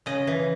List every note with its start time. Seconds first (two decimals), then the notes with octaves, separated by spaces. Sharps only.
0.06 C#3 D#5
0.27 E3